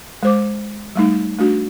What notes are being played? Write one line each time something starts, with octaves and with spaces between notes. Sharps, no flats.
G#3 C5 D6
G3 A3 D#4
A3 D4 F#4